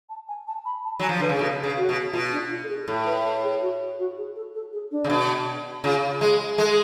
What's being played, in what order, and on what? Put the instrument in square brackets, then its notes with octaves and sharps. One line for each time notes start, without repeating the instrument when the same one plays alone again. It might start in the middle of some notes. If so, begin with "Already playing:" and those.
[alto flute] A5
G#5
A5
B5
A5
[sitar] F#3 [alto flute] G#5
[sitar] F3
[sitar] D3 [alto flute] B4
[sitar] C#3
[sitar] B2 [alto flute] A4
[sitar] C#3
[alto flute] F#4
[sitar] B2
[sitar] B2 [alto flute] F4
[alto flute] D4
F4
A4
G#4
G#4
[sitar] A2 [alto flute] A4
[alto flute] B4
A4
G#4
F#4
F#4
G#4
A4
A4
G#4
D4
[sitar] C#3
B2
[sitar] C#3 [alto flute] F4
[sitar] G#3 [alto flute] G#4
[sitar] G#3 [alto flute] A4